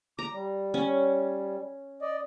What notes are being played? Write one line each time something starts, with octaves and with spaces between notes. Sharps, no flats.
A#5 D6
G3
C#4
D5 D#5